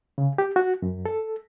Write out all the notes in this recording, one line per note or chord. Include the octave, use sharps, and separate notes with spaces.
C#3
G4
F#4
F#2
A4